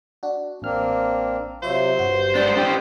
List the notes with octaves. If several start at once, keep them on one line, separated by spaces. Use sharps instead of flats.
D4 F#4
A1 A#3 C4 D4 F6
C3 F#3 F4 C5 C#5 E5
G1 G2 F#4
G#2 D4 F#5 G6
A2 C4 G4